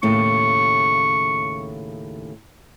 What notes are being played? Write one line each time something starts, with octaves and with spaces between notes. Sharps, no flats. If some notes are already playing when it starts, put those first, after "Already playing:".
D#2 A2 C#3 C#6